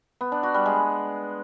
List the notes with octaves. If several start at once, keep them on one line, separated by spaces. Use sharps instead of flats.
B3
D4
F#4
G3
G#3